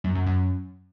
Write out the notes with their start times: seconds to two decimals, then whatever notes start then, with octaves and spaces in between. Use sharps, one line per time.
0.04 F#2
0.15 F#2
0.27 F#2